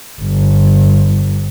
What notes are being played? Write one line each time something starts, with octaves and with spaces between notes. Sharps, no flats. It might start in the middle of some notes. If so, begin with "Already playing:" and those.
G1